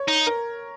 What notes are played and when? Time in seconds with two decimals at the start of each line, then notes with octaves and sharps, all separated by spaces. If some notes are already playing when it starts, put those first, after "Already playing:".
Already playing: C#5
0.08 D#4
0.27 A#4